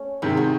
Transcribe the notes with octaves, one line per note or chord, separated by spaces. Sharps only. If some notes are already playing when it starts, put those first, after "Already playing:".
Already playing: A3 C#4
C3 D#3 G#3 E4
F#4